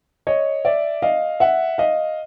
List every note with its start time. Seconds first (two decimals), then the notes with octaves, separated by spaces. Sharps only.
0.27 C#5 D#5
0.65 D5 E5
1.02 D#5 F5
1.40 E5 F#5
1.78 D#5 F5